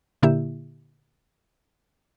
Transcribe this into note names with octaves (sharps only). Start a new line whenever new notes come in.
A#2 D3 A#3 E4 G4 E5